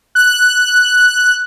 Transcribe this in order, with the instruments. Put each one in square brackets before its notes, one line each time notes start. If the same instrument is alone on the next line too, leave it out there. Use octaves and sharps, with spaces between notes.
[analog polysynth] F#6